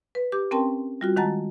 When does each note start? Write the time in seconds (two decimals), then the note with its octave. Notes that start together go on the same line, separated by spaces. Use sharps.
0.15 B4
0.32 G4 D6
0.51 C4 C#4 A#4 G5 A5 C6
1.01 G3 F4 F#4
1.16 D#3 G#3 F#5 A5 A#5 A6